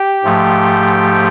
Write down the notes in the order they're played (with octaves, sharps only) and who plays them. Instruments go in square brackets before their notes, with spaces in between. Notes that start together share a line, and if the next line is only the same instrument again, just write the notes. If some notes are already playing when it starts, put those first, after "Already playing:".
Already playing: [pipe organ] G4 G5
G#2 F3 A3